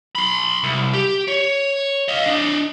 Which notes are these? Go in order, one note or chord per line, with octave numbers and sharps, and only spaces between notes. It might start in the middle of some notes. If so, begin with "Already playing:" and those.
B5 C6
C2
G4
C#5
D#5 F5
D4 D#5